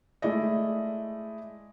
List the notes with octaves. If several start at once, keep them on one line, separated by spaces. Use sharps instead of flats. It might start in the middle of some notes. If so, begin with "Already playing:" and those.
G#3 A3 E4 D5 D#5